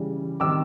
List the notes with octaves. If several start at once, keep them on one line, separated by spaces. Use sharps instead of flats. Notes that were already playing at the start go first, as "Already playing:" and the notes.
Already playing: C#3 E3 G3
D#3 G3 C4 D6 E6